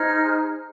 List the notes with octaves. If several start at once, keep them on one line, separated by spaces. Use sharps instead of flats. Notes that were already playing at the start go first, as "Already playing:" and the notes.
Already playing: D#4 G#4 C5 F6